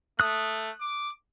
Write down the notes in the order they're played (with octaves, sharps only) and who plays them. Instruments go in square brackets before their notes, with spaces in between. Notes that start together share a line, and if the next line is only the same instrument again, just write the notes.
[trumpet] A3 [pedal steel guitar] D#6 F#6
[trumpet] D6